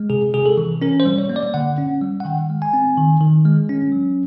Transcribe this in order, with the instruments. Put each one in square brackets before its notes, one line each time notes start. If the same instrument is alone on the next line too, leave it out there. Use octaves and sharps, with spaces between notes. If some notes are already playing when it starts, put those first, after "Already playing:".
Already playing: [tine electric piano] G#3
C3 G#4
C3 G#4
A4
E3
C#4 A#4
C5
G3
C#5
A#3
D5
D3 F#5
C#4
G3
F#5
D#3 G5
G#3
G#5
C4
D#3
D#3
G#3
C#4
F#3